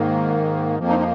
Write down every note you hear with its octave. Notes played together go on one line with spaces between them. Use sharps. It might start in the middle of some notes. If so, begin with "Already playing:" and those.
Already playing: G#2 D#3 A#3
F2 F3 A#3
D#4
D#4